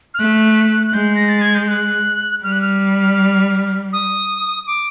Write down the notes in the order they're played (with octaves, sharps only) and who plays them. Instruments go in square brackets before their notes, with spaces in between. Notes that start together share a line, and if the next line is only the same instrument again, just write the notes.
[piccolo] F6
[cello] A3 [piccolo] F#6
[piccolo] F#6
[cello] G#3 [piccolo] G6
[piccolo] A#6
A6
G#6
G6
F#6
[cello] G3 [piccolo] F6
[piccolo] F#6
F6
D#6
D6